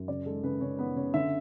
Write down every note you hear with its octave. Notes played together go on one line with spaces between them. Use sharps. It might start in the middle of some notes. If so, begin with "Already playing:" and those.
Already playing: F#2
C#3 D5
G#3 A4
C#3 B4
C#3 C#5
B3 B4
C#3 C#5
D3 E5